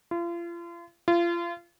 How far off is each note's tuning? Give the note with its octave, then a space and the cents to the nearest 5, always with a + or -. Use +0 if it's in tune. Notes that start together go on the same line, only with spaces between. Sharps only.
F4 -35
F4 -30